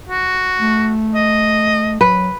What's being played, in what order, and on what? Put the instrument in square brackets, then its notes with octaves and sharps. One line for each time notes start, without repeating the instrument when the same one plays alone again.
[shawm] F#4
[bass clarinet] A3
[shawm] D#5
[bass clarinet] F#3 [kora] B4